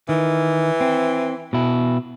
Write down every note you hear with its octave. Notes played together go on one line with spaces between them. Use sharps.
D#3 E3
C4
B2 E4